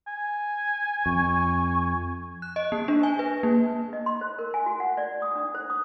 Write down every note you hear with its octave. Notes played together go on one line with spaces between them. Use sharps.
G#5
F2 C#6
F#6
D#5
A#3
D4
G#5
B4
A#3
D#5
C6
C5
A#4
G#5
F#4
F#5
D5
D#6
D4
C5
D#6